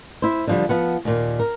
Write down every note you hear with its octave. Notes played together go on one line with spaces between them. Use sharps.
E4 C5
D3 F3 G3
F3 B3 F#5
D#2 A#2
A#4